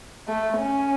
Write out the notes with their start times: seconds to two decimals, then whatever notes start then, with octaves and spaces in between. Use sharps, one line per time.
0.28 A3
0.58 C#4